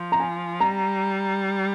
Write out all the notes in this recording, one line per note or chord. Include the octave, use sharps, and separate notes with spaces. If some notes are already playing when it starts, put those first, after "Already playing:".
Already playing: F3
A#5
G#5
G3 A#5